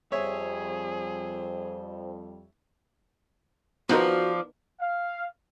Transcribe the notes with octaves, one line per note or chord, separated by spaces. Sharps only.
F2 G3 G#4 C5 C#5 E5
F3 B3 D4 D#4 F#4 A#4
F5